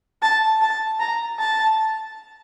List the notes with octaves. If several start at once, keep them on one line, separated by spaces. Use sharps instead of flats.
A5
A5
A#5
A5